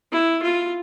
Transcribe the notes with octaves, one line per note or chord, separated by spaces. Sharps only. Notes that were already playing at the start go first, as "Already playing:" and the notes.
E4
F4